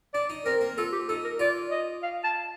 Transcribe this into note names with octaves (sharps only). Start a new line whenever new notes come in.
D4 D5
D#4
C4 A#4
A#3
F4 A4
G4
D#4 A4
A#4
F4 D5
D#5
F5
A5